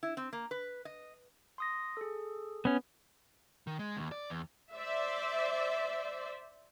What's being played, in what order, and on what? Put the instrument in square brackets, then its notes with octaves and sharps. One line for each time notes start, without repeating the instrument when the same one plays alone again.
[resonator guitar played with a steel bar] E4
C4
A#3
B4
D#5
[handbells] C6 D#6 A#6
G#4 A4
[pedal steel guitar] B3 C#4
[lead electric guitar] D#3
G#3
D#2
D5
E2
[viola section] C5 D5 E5